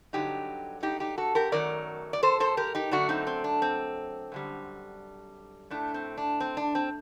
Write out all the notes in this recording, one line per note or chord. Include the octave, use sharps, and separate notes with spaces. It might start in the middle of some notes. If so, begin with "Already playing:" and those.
G2 D3 F#3 D#4 G4
D#4 G4
D#4 G4
F#4 A4
G4 A#4
F#2 D#3 F#3 A3 A#4 D5
D5
A4 C5
A4 C5
G4 A#4
D#4 G4
F#2 D3 A3 D4 F#4
C4 D#4
C4
D4
C4
F#2 D3 G3
A2 A3 D4
C4
D4
C4
D4
C4